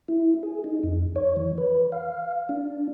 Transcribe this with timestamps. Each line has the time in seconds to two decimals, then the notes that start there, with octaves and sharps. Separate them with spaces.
0.08 E4
0.43 G#4
0.64 D#4
0.83 F2
1.16 C#5
1.36 E3
1.58 B4
1.92 F5
2.49 D4